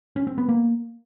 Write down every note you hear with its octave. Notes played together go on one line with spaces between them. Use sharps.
C#4
C4
B3
A#3